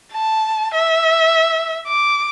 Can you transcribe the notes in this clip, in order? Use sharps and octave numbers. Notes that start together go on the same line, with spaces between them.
A5
E5
D6